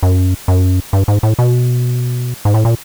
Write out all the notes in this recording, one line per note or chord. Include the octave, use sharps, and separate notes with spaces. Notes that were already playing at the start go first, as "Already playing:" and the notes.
F#2
F#2
G2
G#2
A2
B2
G#2
A2
A#2